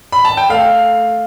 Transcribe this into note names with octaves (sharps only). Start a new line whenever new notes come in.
B5
A5
G5
A3 F5